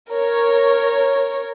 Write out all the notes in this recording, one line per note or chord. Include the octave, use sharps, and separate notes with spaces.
A#4 C#5